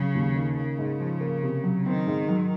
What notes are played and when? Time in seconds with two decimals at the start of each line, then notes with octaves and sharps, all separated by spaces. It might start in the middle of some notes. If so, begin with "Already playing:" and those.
Already playing: C#3 F#3
0.15 D#2
0.35 D#3
0.57 C#3 A#3
0.78 G#2
1.00 F3
1.21 A#3
1.43 C3
1.64 F#3
1.85 D#3 C4
2.07 G#2
2.29 F#3